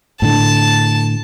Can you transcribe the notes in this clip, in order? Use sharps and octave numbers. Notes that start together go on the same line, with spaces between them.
A2 D3 A5